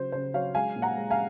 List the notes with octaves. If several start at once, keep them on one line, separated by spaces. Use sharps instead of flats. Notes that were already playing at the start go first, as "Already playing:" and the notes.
Already playing: C#3 F#3 C5
C#3 C5
F#3 C#5 F5
G#3 F5 G#5
A#2
F#5 A#5
G#3
F5 G#5